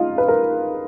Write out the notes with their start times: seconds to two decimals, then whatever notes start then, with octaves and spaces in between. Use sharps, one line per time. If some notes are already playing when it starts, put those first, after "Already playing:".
Already playing: D#4 F4
0.18 B4
0.28 A#4